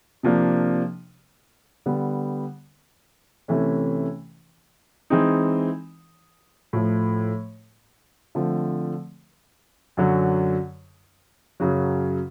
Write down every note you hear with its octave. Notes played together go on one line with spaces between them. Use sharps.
C3 F3 A#3 D4
D3 G3 B3
C3 E3 A3 C#4
E3 G#3 C4 D#4
A2 F3 A3
D3 F3 A3 C4
F#2 D3 F#3
F#2 C#3 F#3